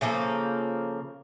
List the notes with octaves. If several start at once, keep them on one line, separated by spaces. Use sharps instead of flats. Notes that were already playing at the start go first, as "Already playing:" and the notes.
C#3 F3 A#3 A4